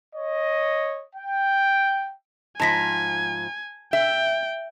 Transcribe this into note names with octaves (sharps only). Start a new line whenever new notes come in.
C#5 D#5
G5
G#2 F3 G#5 A5 A#6 B6
E5 G5